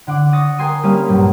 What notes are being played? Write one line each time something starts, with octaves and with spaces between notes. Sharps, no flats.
D3 F#5 D6
C#6 D#6 A6 A#6
A#4 G5 G#5 C6 D#6
G3 A#3 C#4 D4 F5 D#6
A#1 G2 F#3